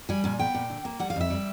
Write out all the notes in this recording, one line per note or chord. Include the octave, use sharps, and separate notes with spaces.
G3 G#5
A#2 G#5
B3 G5
A#2
D3
A#3
G3 F#5
F5
F2 E5
G3